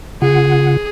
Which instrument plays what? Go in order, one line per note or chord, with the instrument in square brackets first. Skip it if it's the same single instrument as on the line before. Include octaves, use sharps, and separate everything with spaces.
[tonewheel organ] C#3 F4 F#5 [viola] G#4